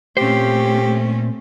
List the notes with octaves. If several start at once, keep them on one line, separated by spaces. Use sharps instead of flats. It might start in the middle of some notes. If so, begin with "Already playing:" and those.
A#2 A3 C4 C#4 G4 C5